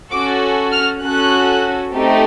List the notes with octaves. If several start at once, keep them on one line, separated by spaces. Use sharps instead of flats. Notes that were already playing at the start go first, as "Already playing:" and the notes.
C#4 F#4 A4 D6
F6
C#4 F#4 A4 F#6
A3 C4 D#4 G4